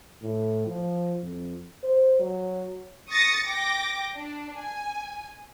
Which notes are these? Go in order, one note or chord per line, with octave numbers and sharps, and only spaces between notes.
A2
F3
F2
C5
F#3
C#6 D#6 A6 A#6 C#7
G5 D6 A#6
D4
G#5